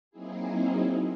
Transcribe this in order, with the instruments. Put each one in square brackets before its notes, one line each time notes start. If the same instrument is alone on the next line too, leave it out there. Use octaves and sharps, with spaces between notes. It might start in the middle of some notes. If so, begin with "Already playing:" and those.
[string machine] F#3 A#3 C4 D#4 E4 G#4